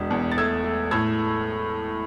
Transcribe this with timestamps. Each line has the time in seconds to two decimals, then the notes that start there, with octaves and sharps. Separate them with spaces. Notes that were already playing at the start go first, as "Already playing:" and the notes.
Already playing: E1 D4
0.11 E2
0.32 A6
0.37 A3 E6 G#6
0.64 A3
0.91 A2 E6 G#6